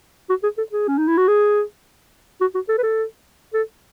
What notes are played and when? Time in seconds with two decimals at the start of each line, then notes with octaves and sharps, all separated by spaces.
0.29 F#4
0.43 G#4
0.58 A4
0.72 G#4
0.88 C#4
0.98 D#4
1.08 E4
1.18 F#4
1.28 G#4
2.41 F#4
2.55 F#4
2.69 A4
2.78 B4
2.83 A4
3.54 A4